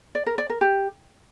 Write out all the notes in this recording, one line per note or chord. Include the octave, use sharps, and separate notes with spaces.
D5
A#4
D5
A#4
G4